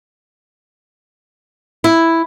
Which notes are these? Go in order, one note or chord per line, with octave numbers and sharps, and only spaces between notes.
E4